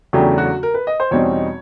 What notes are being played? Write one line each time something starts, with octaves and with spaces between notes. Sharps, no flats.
E2 C#3 F#3 A3 D4 G4
F#4
A#4
B4
D#5
C5
E2 B2 G3 C4 D#4 C#5